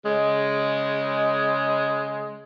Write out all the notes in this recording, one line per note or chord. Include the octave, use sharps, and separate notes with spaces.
C#3 G#3